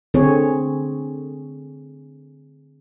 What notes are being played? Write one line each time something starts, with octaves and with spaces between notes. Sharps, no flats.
D3 C4 G#4 C#5